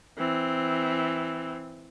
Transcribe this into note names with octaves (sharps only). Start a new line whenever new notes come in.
E3 C4